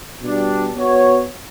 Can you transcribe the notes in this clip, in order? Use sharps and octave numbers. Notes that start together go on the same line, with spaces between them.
B2 G3 D4
B3 F#4 C#5